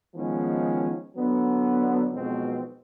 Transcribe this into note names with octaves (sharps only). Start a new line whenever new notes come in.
D#3 F3 G#3 B3 C#4
D3 F#3 B3
B1 F2 B2 G#3 C4